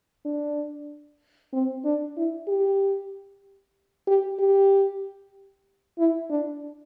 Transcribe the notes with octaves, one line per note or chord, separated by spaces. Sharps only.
D4
C4
D4
E4
G4
G4
G4
E4
D4